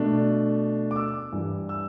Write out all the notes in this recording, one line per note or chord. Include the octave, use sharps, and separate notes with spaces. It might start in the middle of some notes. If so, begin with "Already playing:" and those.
Already playing: B2 A3 D4
D6
E6
G2 E3 G3
E6